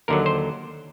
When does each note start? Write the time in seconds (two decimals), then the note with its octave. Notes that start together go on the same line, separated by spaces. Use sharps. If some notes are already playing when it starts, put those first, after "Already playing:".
0.08 D#2 D3 F#3 A#4
0.26 C5